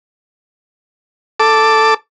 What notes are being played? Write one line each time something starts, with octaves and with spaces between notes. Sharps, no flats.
A4 D6